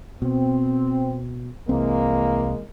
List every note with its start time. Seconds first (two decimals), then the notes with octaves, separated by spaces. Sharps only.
0.22 B2 C4
1.69 C2 E3 G#3 A#3 C4